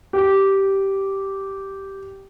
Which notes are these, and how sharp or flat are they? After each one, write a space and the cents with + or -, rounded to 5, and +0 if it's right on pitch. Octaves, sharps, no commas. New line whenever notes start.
G4 -10